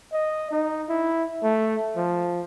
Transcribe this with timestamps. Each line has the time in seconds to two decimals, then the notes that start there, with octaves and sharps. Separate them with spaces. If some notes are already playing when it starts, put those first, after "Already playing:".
0.12 D#5
0.51 D#4
0.89 E4
1.43 A3
1.96 F3